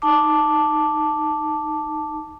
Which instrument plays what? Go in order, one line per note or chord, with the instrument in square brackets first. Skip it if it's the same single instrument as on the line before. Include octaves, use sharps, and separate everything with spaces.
[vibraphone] D#4 A5 D6